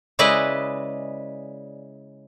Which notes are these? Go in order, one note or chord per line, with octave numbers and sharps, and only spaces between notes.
C#3 G#3 E4 B4 D5 D#5